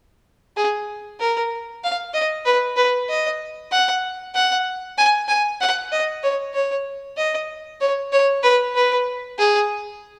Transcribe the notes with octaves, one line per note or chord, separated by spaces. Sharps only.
G#4
A#4
F5
D#5
B4
B4
D#5
F#5
F#5
G#5
G#5
F#5
D#5
C#5
C#5
D#5
C#5
C#5
B4
B4
G#4